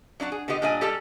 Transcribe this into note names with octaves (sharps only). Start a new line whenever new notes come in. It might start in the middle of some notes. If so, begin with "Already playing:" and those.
F#3 D4 D#4 F#4
G#4
D3 B3 G4 D#5
A#2 G3 D4 D#5 G#5
G3 G4 A4 D5 A5